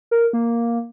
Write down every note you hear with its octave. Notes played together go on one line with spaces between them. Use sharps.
A#4
A#3